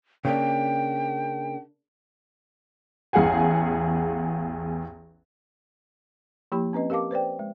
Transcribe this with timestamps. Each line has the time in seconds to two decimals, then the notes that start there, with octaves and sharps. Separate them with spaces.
0.25 C#3 A#3 D4 G5
3.13 A1 E2 G#4 F5 F#5 G#5
6.52 F3 A#3 E4 G4 B5
6.73 C4 C#4 B4 D#5
6.90 G4 A#4 F5 A5 D6
7.11 B4 C5 D5 G5
7.39 G#3